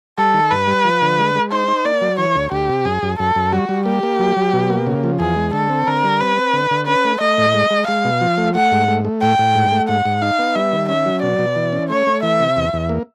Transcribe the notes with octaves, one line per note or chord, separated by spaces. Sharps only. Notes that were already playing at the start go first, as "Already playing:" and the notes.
G3 A4
D#3
G2 B4
G3
F3
D3
G#3
G#3
D#4 C5
D#4
A#3 D5
F#3
E3 C#5
D2
D2 G4
C3
F#2 G#4
F#2
F#2 A4
F#2
G3 F#4
G3
A#3 G4
A#3
F#3
F#3
B2
A#3
C#3
F3
E2 G#4
G#3
D3 A4
C4
D3 A#4
G3
C4 B4
C4
D3
D3
C#4 B4
A3
A3 D#5
A2
G#3
G#3
G#3 F5
B2
F3
A3
A3 F#5
G#2
A3
A3
A2 G5
A2
G#2
A3
G#2 F#5
G#2
D#4 F5
B3
G3 E5
D#3
C#4 E5
F#3
B2 D5
B2
E3
C#4
A3 C#5
A3
E3 E5
C3
E2
E2
A#3